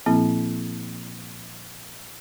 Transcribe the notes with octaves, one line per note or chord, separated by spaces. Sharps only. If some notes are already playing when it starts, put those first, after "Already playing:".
A#2 F3 A#3 C4 E4